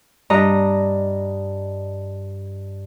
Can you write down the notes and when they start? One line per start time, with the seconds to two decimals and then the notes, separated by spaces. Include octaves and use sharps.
0.30 G2 D#5 A#5